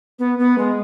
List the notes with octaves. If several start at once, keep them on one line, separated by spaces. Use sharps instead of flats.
B3
B3
G#3